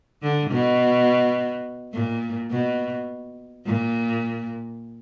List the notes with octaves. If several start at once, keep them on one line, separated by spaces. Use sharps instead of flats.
D3
B2
A#2
B2
A#2